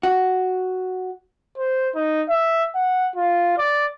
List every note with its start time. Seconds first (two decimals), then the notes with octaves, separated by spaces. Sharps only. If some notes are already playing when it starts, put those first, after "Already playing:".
0.03 F#4
1.58 C5
1.95 D#4
2.29 E5
2.75 F#5
3.15 F4
3.58 D5